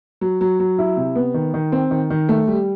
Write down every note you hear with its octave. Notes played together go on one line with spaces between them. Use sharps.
F#3
F#3
F#3
E4
C3
B3
D#3
D#3
C4
D#3
D#3
A3
G3